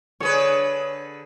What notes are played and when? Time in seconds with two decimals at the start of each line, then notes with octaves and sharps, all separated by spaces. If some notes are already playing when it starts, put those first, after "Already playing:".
0.20 D3 G#4 B4 C#5